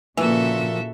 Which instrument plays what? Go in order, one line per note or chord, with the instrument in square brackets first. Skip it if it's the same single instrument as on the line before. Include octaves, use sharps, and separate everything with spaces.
[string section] A#2 C#3 [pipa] E3 [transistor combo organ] F3 A#3 [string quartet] F#4 A4 E5